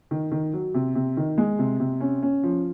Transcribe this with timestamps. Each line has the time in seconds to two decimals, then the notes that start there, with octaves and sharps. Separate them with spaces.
0.11 D#3
0.31 D#3
0.53 F#3
0.74 C3
0.95 C3
1.17 D#3
1.38 G#3
1.59 C3
1.80 C3
2.01 C#4
2.22 C#4
2.43 F3